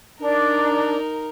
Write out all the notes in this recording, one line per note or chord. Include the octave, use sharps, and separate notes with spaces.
D4 D#4 A#4